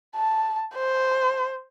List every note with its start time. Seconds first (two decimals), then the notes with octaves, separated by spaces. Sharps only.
0.15 A5
0.75 C5